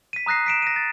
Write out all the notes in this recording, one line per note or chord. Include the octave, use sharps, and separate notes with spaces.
B6 D#7
A#5 D#6 F#6 A#6 C7
B6 D7 E7
A#6 D#7
A6